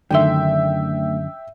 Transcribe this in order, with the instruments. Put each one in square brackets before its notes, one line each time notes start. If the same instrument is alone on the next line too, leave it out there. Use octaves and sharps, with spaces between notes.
[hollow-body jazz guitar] F#2 D3 C6 [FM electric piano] D#3 A3 D4 [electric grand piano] E5 G5